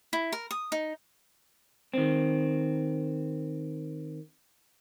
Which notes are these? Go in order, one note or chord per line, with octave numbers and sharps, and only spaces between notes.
E4
A#4
D#6
D#4
D#3 C4